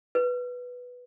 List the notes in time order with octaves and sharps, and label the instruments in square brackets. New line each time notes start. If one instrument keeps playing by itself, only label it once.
[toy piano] B4